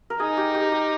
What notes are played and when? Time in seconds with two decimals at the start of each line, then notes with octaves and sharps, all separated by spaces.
0.10 A#4
0.19 D#4 G#4
0.37 G4
0.54 G4
0.72 G4